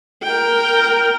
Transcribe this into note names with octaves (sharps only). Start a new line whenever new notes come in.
A#4 G5